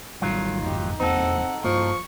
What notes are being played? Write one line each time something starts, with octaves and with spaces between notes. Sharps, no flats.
A1 A2 D#3 F#3 G3 F4
G1 F2 G#2 D#4 G4
F1 E2 A#3 C4 D#4 A4 F#5
G2 F3 A#3 C#6